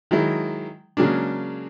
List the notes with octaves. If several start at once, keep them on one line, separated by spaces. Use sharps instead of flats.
D#3 F#3 G#3 E4
C#3 F#3 G#3 A#3 D4